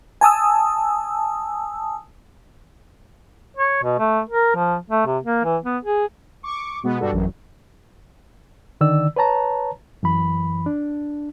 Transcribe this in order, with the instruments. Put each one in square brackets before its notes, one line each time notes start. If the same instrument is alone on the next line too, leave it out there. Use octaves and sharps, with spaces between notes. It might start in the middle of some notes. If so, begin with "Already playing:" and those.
[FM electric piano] G#5 A5 D#6 E6
[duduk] C#5
B2
A3
A#4
F3
A3
C3
A#3
E3
B3
G#4
[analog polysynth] C#6 D6
B2 G#3 B3
G2 G3 D4 F#4 A4
A1 F#2 F#3
[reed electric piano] D3 D#3 D5 E6
B4 C#5 A5 A#5
F#2 E3 B5
D4